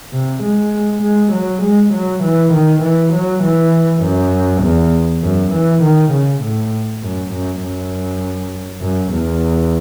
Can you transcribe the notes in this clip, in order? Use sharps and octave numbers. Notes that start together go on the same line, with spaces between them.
C3
G#3
G#3
F#3
G#3
F#3
E3
D#3
E3
F#3
E3
F#2
E2
F#2
E3
D#3
C#3
A2
F#2
F#2
F#2
F#2
E2